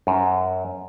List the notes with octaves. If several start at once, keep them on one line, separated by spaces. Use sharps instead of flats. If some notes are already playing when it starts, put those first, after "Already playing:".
F#2